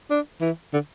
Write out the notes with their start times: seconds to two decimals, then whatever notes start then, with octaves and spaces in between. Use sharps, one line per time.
0.10 D4
0.41 E3
0.74 D3